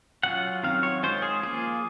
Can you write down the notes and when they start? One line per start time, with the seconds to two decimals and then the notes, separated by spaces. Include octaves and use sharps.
0.23 F#3 C#4 F4 F#5
0.63 D#3 F#3 C4 F5
0.83 C#5
1.03 D#3 G#3 C#4 F4 C5
1.22 G#4
1.43 F3 A#3 F4 G#4